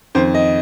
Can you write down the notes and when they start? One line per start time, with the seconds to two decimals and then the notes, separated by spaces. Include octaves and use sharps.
0.15 F2 D#3 C5
0.34 D#5